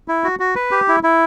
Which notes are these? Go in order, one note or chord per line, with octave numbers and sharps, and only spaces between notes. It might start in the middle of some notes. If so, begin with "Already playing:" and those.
E4
F#4
F#4
B4
G4
E4
E4